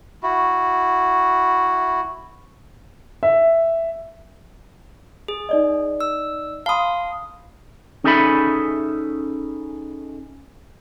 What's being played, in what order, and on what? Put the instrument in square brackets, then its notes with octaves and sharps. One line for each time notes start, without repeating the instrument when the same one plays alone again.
[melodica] E4 F#4
[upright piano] E5
[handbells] G#4
[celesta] D#4 D5 D#5
[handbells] E6
[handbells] F5 D#6 [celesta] A5 B5 C6
[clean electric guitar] C#4 D#4 G#4 A4 E5 B5